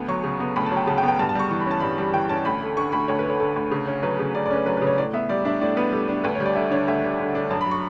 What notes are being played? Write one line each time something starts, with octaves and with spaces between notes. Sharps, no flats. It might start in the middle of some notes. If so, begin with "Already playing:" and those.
Already playing: D2 B3
F#3 C#6
C#3
B3
D2 B5
A5
F#3
G5
C#3 A5
G5
B3
G5
G2 A5
A5
G3 C#6
E3 C#6
B5
C#4 A5
G2 B5
G3
E3 G5
C#4 A5
D2 B5
A3
D3 C#6
D2 B5
D2 C#5
B4
A3 C#5
D3 A4
D2
C#3
C#4
F#3 B4
C#3
C#3 D5
D5
C#4
B4
F#3 B4
B4
C#3
C#5
A2 D5
B3 E5
G3 D5
D4 E5
A2 D5
B3 B4
G3 A4
D4
D2 B4
C#5
G3
D5
D3 E5
D4 C#5
D2 E5
G3
D3
D4
F#2 A5
B5
F#3 C#6